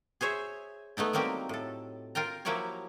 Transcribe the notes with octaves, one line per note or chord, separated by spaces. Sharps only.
G#4 C5 C#5 E5
A3 B3 D#4 E4
F#3 G3 A#3 C4 G4
A2 A4
F4 A#4 G5 A#5
F3 F#3 A#3 E4 G4 C#5